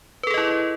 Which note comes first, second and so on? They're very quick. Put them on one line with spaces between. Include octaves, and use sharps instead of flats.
B4 A4 G#4 D#5 E4